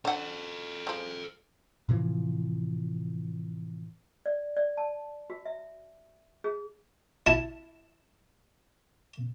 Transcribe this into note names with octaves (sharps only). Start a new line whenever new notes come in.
D4 A4 C5 F#5
F3 G#3
A2 C3 E3 F3
D5
D5
A5
F#4
E5
G#4
E4 A5